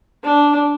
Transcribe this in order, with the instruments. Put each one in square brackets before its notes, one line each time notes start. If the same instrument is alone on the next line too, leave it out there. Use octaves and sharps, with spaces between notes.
[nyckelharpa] D4